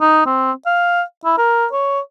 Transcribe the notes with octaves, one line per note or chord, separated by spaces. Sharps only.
D#4
C4
F5
E4
A#4
C#5